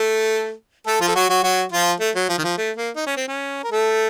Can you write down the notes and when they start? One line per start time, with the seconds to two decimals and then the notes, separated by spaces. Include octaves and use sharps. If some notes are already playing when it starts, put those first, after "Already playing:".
Already playing: A3 A4
0.87 A3 A4
1.00 F3 F4
1.08 A4
1.16 F#3 F#4
1.29 F#3 F#4
1.43 F#3 F#4
1.72 F3 F4
2.00 A3
2.15 F#3
2.29 F3
2.38 D#3
2.44 F3
2.58 A3
2.77 A#3
2.96 D#4
3.06 C#4
3.17 C4
3.28 C#4
3.64 A#4
3.71 A3 A4